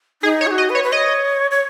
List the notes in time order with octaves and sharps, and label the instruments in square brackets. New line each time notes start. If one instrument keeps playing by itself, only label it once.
[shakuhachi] D#4 [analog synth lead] G#4
[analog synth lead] C#5
[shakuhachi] G#4
F#4
[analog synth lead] D#5
[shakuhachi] B4
[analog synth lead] C#5
[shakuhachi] B4
[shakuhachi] C#5 [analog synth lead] D#5
[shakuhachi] C#5